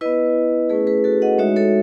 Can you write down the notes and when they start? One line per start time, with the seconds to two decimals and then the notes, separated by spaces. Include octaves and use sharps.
0.01 B3 E4 B4 D#5
0.70 A3 C#4 E4 G#4 B4
0.87 G#4 B4
1.04 F#4 A4
1.22 D#5 F#5
1.38 G#3 D#4 F#4 C#5 E5
1.56 A4 C#5